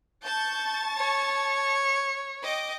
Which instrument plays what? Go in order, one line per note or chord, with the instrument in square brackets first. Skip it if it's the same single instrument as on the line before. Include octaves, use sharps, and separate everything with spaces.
[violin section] A5 C#6 A6 [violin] G6
[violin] C#5
[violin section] D#5 G5 D6